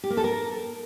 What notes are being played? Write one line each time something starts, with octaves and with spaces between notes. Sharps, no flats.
G4
A#3
A4
A#4